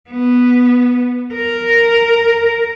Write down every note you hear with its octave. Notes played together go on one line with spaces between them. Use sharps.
B3
A#4